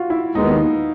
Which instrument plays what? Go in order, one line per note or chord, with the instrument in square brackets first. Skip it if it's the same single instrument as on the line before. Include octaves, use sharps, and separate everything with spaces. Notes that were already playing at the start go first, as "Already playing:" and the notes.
Already playing: [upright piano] F4 F#4
E4
[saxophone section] D#2 D#3 G#3 B3 [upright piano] D#4